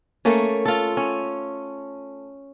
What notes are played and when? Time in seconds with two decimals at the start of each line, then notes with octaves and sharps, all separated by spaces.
0.25 A3 A#3 C#4
0.65 F4 A4
0.97 C#4